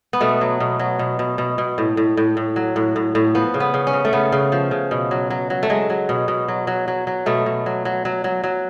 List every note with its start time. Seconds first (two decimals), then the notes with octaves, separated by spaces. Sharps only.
0.13 B3
0.21 B2 A3
0.41 F#3
0.60 B2
0.79 F#3
0.99 B2
1.19 B2
1.38 B2
1.58 B2
1.78 A2
1.97 A2
2.17 A2
2.37 A2
2.56 F#3
2.76 A2
2.96 A2
3.15 A2
3.35 F3 B3
3.54 C#3
3.60 B3
3.74 C#3
3.87 C#4
3.93 C#3
4.05 A3
4.13 C#3 B3
4.32 C#3
4.52 F3
4.71 C#3
4.91 B2
5.11 F#3
5.30 F#3
5.50 F#3
5.63 A3
5.70 F#3 G#3
5.90 F#3
6.09 B2
6.28 B2
6.48 F#3
6.67 F#3
6.88 F#3
7.07 F#3
7.26 B2 A3
7.46 B2
7.66 F#3
7.85 F#3
8.05 F#3
8.24 F#3
8.44 F#3